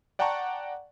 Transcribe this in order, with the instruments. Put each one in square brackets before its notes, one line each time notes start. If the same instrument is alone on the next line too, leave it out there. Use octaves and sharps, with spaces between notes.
[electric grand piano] D5 F#5 G5 A5 A#5 C#6